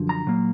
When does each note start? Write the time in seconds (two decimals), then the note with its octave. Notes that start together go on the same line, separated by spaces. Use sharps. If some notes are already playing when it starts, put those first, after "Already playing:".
Already playing: F#2 D3 F3
0.09 A#5
0.27 A#2 F#3 A#3